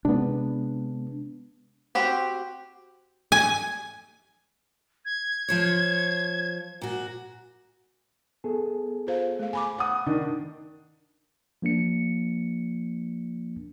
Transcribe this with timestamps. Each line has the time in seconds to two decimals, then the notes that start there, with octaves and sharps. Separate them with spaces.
0.05 C3 G#3 B3 D4
1.95 C4 F#4 G4 C5
3.32 G#5
5.05 G#6
5.48 F3 C5 C#5
6.82 A#2 F#4
8.44 B3 G#4 A4
9.07 F4 C5 F5
9.39 A3 F5
9.53 G#5 B5 D6
9.78 F#5 D#6
10.06 D#3 D4
11.62 F3 A#3 D4 C#7